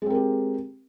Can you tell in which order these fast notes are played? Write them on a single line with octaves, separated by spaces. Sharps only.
G#3 C4 A#4 G4